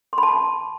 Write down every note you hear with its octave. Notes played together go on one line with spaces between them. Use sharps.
C6
B5
A5